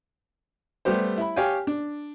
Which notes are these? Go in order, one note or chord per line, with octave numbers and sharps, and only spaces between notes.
G3 A3 B3 G4 C5
E4 B5
G4 C#5 F5 G5 G#5
D4